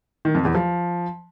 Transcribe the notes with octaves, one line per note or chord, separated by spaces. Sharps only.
D#3
F2
E2
F3